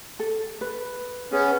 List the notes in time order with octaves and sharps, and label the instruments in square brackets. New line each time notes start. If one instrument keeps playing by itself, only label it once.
[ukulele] A4
B4
[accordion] B3 C#4 [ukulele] G#4